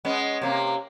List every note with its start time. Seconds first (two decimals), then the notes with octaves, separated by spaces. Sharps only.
0.05 G#3 B3 C#4
0.42 C3 A#3